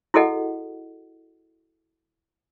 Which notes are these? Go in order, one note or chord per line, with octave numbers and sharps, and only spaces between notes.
E4 F#4 G#4 A4 D#5 F#5